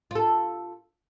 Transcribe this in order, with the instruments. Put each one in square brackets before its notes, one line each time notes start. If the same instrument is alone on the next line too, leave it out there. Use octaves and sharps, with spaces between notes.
[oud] F4 A4